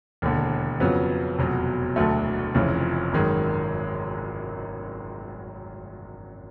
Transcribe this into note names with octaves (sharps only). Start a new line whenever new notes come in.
E1 D#2 D3
F2 C#3 F#3 B3
F1 E2 B2 F#3
E1 D2 D3 F#3 A3
F1 F2 C#3 E3
G#1 F#2 D#3 G#3